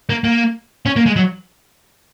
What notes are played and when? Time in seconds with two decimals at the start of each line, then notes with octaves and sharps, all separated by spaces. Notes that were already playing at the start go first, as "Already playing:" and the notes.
0.09 A#3
0.24 A#3
0.86 C#4
0.96 A#3
1.06 G#3
1.16 F#3